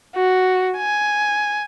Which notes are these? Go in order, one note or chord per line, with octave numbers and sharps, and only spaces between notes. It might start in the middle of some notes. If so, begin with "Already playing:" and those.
F#4
G#5